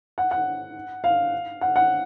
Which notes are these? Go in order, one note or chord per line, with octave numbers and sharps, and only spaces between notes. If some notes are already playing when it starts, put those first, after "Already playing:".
F#5
F#5
F5
F#5
F#5